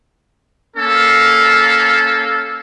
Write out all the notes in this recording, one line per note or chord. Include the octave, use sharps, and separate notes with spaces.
A#3 C#4 A4 F5